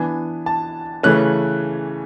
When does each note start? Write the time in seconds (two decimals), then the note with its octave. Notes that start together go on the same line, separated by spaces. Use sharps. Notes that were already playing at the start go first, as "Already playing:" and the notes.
Already playing: E3 B3 D4 G#5
0.46 A5
1.03 C#3 E3 A3 C#4 F#6